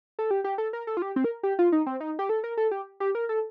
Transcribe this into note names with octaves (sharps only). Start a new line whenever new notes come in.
A4
G4
G4
A4
A#4
A4
F4
G4
C4
A#4
G4
F4
D#4
C4
D#4
G4
A4
A#4
A4
G4
G4
A#4
A4